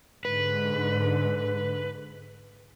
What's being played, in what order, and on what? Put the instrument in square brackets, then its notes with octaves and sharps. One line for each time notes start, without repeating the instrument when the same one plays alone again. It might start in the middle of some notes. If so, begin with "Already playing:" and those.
[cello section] G#2 D3 [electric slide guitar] B4